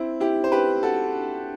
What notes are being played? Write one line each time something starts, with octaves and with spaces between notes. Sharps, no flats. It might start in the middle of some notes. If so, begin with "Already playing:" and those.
Already playing: C4 E4
E4 G4
C5
G4 B4
F#4 A4